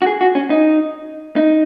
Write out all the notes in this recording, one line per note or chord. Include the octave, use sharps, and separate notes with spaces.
F#4
G#4
F#4
C#4
D#4
D#4